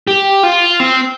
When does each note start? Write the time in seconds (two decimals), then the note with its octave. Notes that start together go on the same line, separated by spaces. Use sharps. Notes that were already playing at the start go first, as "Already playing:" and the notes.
0.07 G4
0.43 F4
0.80 C4